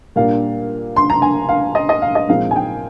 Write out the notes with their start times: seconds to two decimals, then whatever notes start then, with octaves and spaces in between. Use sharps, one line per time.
0.16 A#2 G3 A#3 D4 F5
0.96 C6
1.10 A#5
1.22 G#5
1.49 F5
1.75 D#5
1.89 D#5
2.02 F5
2.15 D#5
2.28 A#2 F3 G#3 C4 D#4 F5
2.51 G#5
2.56 G5